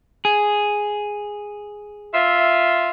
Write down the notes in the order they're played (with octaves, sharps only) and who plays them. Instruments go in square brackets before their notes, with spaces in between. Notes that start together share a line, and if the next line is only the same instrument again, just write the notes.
[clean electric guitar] G#4
[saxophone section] F4 E5